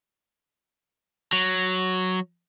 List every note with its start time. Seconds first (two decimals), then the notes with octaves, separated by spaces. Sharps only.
1.33 F#3